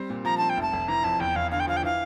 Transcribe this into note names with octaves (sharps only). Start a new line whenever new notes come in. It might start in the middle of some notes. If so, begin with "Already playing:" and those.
Already playing: G3 C4
A#2
F3 A#5
C4 A5
G5
F1 A5
F1
E3 A#5
F2 A5
E2 G5
E2 F5
D3 F5
G5
F3 F5
G5
E3 F5